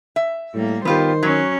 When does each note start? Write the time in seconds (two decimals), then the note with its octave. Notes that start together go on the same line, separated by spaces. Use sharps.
0.16 E5
0.54 A2 G3 A#3
0.85 D#3 B3 F4 G4 C5
1.23 F#3 C#4